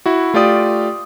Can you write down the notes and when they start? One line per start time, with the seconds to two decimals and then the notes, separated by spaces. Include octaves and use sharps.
0.06 E4 F#4
0.34 A3 F4 G4 D5 D#6